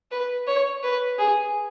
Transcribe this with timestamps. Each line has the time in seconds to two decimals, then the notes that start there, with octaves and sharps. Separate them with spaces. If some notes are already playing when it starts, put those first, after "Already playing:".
0.11 B4
0.47 C#5
0.83 B4
1.19 G#4